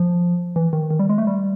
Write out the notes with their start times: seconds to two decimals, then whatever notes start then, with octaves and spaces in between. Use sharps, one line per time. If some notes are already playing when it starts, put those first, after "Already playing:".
Already playing: F3
0.56 E3
0.73 D#3
0.90 D#3
0.99 G3
1.09 G#3
1.18 A3
1.27 G3